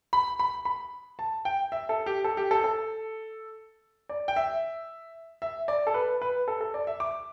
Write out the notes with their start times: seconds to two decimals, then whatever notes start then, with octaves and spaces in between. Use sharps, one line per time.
0.13 B5
0.39 B5
0.65 B5
1.19 A5
1.45 G5
1.72 E5
1.89 A4
2.06 G4
2.24 A4
2.37 G4
2.51 A4
2.64 A4
4.09 D5
4.28 G5
4.36 E5
5.42 E5
5.68 D5
5.87 A4
5.94 B4
6.22 B4
6.48 A4
6.61 A4
6.74 D5
6.87 E5
7.00 D6